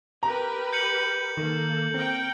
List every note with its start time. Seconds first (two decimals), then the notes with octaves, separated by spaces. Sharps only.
0.23 G4 A#4 B4 A#5
0.73 G6 C#7 F#7
1.37 D#3 A#3 A4
1.94 C4 A#4 G5